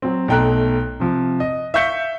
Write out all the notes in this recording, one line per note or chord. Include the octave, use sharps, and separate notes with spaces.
F#3 C4
B1 A3 G5 A#5 F#6
C3 F3
D#5
E5 F5 C#6 G6 B6 C#7